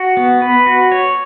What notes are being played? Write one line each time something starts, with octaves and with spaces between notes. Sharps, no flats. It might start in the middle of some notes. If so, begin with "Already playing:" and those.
Already playing: F#4
B3
B4
F#4
C#5